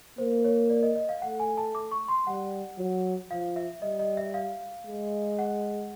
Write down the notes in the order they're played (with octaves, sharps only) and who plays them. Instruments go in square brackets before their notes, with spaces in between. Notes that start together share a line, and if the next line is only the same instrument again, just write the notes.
[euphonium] A#3 [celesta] C5
[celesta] C#5
D5
D#5
D#5
F5
[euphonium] A3 [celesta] F#5
[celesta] G#5
A5
D6
C#6
C6
[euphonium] G3 [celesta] F#5
[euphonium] F#3
[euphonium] F3 [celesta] F5
[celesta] E5
[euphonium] G3 [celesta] D#5
[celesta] D#5
E5
F5
[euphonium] G#3
[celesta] F#5